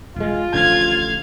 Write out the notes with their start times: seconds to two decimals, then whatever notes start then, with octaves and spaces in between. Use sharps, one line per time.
0.16 E1 G#3 F4
0.54 A1 D3 F3 F5 G#6